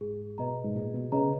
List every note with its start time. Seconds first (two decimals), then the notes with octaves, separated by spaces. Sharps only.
0.01 G#2 G#4
0.38 B2 B4 D#5 A#5
0.64 G#2
0.75 A#2 G#4
0.94 B2
1.12 C#3 B4 D#5 A#5